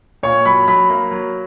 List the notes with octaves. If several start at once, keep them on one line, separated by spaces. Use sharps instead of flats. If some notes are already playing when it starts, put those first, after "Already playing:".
A#2 C#5
F#3 B5
F#3 B5
A#3
F#3